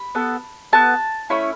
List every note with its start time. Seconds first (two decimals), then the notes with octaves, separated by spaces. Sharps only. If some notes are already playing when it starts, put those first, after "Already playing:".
Already playing: B5
0.15 B3 A4
0.73 B3 A4 A5
1.30 A3 C#4 E4 B5